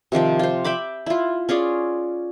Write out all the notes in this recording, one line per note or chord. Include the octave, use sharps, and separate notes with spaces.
C3 D#3 F3 G5
F4 C5
E5 G5 B5 D6
E4 F4
C#4 F4 G#4 D5